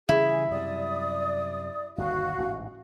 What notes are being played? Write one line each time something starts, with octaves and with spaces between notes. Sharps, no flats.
C#3 E3 G3 E4 G#4
F#2 C3 G3 D5 D#6
G1 D#2 B2 F#4 F5
A1 G#2 B2